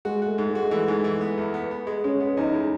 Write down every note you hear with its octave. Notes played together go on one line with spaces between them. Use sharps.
G#3 F#4
A3 F#4
G#2
G#3
F#4
G#3
E3 A3
G#2
E3
B3
E2
B3
B3
G#3
G#3 C#4
B3
E2 D#4
G#3